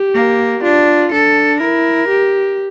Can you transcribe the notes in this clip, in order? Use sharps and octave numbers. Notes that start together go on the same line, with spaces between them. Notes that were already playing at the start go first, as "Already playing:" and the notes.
Already playing: G4
A#3
D4 F4
D4 A4
E4 A#4
G4